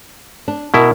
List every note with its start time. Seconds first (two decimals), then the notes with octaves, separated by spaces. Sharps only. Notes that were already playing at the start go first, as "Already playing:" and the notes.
0.48 D4
0.74 B2 E4 A#4